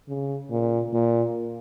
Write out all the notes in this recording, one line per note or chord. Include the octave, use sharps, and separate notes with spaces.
C#3
A#2
A#2